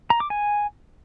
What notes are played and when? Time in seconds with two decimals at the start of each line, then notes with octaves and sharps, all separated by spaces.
0.10 A#5
0.20 D6
0.30 G#5